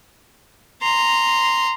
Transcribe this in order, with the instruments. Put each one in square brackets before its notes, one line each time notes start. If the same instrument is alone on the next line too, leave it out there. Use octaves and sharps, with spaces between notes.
[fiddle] A#5 C6